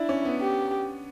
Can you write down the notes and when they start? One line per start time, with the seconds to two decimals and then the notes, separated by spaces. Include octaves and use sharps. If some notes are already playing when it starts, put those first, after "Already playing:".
Already playing: D4 E4
0.09 C#4
0.25 B3
0.41 G4